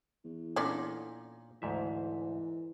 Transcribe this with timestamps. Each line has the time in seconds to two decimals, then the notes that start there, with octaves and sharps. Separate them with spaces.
0.24 E2
0.56 A#2 D3 C#4 D#4 D5
1.62 D2 G#2 E3 E5